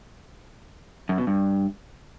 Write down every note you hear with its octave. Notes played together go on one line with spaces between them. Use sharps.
F#2
B2
G2